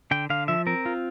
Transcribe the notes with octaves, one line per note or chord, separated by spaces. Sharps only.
D3 G5
D3 F5
F3 E5
C4 A#4
F4